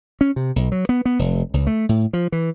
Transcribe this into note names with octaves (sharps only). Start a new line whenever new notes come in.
C#4
C3
B1
F#3
B3
B3
F1
C#2
A3
A2
F3
E3